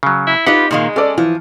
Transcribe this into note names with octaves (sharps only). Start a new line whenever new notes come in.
C#3 F#3
E4
D#4 F4 G4 B4 F#5
A#2 D#3 G#3 A#3
C#4 A4 D5
E3 F3